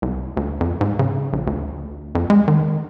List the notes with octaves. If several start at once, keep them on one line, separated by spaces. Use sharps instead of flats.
C2
D2
F2
G#2
C#3
A#1
D2
F2
G#3
D#3